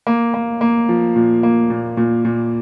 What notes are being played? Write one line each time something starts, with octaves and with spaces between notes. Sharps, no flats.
A#3
A#3
A#3
F3
A#2
A#3
A#2
A#2
A#2